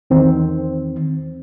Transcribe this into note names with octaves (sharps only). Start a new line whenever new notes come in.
E2 D#3 C4